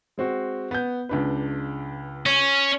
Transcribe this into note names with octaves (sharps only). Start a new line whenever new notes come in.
G#3 C4 F#4
B3 G6
C#2 D4 B4
C#4